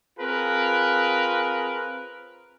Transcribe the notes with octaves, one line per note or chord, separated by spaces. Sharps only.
C4 F4 G#4 A#4 B4